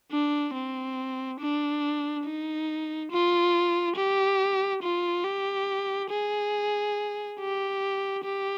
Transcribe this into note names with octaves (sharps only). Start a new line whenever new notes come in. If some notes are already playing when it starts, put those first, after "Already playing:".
D4
C4
D4
D#4
F4
G4
F4
G4
G#4
G4
G4